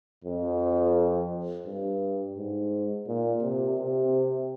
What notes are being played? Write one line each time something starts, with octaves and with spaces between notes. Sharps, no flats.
F2
G2
G#2
A#2
C3
C3